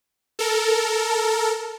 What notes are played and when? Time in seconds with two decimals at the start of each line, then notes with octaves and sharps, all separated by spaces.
0.39 A4 A#4